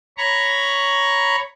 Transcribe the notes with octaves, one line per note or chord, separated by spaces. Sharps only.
C#5 A#5 B5 C#6